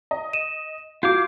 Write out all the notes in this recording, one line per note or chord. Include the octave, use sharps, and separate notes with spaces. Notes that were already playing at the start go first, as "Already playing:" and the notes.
D#5
D#7 E7
F4 F#4 F5 D6 G6 G#6